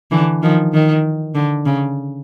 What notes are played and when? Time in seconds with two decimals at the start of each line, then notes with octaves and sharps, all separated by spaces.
0.11 D3 E3
0.42 D#3 F3
0.73 D#3
1.35 D3
1.66 C#3